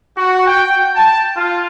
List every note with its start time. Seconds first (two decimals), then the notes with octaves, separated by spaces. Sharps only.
0.17 F#4
0.46 G5
0.96 A5
1.36 F4